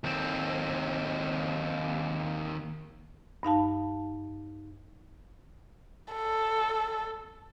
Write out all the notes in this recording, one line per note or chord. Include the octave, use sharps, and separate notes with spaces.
D#2 C4
G2 D#4 F5 A5
A4